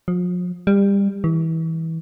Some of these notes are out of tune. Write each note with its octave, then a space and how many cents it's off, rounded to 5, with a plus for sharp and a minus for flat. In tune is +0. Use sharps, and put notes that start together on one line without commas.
F3 +40
G3 +25
E3 -25